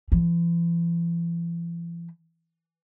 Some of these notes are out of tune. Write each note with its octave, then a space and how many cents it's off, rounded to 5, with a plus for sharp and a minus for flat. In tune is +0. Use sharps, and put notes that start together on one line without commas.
E3 +45